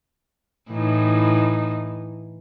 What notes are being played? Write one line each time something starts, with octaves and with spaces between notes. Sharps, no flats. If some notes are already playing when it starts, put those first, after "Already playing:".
A2 E3 D#4